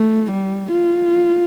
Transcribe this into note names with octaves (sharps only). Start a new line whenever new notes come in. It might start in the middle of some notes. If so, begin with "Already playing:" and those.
Already playing: A3
G3
F4